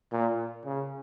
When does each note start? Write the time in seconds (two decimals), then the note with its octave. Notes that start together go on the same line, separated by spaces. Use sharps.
0.12 A#2
0.66 C#3